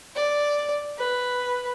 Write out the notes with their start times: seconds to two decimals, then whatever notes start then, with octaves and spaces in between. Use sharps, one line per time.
0.16 D5
0.98 B4